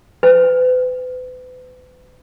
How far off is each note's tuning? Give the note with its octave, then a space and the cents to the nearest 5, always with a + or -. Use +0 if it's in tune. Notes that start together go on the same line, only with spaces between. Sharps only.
B4 +40